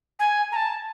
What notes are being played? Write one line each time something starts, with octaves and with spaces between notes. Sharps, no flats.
G#5
A#5
A5